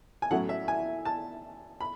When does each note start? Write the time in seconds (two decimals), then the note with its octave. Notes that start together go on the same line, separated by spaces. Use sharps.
0.22 G#5
0.31 A2 F#3 A3 C#4 E4 F#5
0.49 E5
0.68 G#5
1.05 A5
1.81 B5